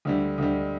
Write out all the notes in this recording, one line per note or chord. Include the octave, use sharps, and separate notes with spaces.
D2 D3 G3
D2 D3 G3